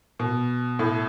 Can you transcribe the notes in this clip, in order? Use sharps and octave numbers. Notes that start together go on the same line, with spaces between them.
B2
A2